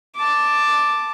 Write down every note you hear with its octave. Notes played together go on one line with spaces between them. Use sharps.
A5 D6